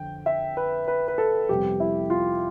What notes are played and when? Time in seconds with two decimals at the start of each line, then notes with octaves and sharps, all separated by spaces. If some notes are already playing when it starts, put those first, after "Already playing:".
Already playing: F2 D3 G5
0.26 E5
0.57 B4
0.88 B4
1.08 B4
1.18 A4
1.49 F2 C3 G3 B3 G4
1.80 E4
2.10 F4